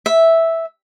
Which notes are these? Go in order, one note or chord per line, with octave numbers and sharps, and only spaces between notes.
E5